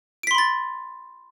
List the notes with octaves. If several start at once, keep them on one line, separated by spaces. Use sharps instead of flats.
B5 C6 A6 B6 D7